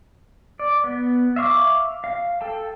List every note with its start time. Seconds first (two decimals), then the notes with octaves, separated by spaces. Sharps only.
0.59 D5
0.84 B3
1.36 E5 F5 C#6 D6
2.04 F5
2.41 A4 G5 A5